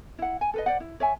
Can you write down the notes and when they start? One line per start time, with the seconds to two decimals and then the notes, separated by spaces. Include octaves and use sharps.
0.19 E4 F#5
0.41 G#5
0.54 A4 B4 D#5
0.66 C5 D5 F#5
0.80 E4
1.00 C#5 E5 G#5